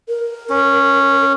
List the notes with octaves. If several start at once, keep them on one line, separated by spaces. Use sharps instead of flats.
A#4
C#4